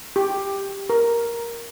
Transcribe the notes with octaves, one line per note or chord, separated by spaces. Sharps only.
G4
A#4